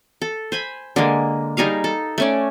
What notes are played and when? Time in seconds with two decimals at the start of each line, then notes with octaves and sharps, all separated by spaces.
0.22 A4
0.52 C5 G#5 B5
0.96 D3 G#3 A#3
1.57 G3 D#4 G#4 F5
1.84 A4
2.18 A3 C#4 D5